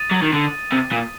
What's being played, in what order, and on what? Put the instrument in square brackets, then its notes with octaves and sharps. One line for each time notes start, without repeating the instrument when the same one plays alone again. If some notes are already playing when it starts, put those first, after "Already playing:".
Already playing: [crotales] D#6 A6 D#7
[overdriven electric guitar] F#3
D#3
D3
C3
A#2